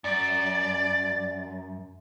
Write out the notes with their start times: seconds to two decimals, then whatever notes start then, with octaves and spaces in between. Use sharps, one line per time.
0.04 F#2 D5 A6